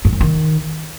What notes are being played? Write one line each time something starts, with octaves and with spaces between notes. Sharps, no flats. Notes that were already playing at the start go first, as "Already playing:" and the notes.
G#2
F#2
D#3